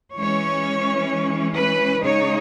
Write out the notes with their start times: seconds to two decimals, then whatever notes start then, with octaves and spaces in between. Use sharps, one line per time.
0.16 E3 G#3 C#4 C#5
1.55 B4
2.02 C#3 G#3 D#4 C#5